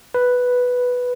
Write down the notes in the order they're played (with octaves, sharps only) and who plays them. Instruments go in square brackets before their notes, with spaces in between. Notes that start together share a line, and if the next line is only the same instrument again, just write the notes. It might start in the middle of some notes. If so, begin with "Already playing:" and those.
[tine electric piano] B4